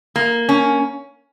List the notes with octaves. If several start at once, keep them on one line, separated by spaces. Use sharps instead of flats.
A#3
C#4